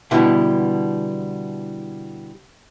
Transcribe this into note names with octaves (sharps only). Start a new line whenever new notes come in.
B2 D3 E3 G3 G#3 E4